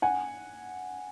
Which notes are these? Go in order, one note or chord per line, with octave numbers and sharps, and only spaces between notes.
F#5 G#5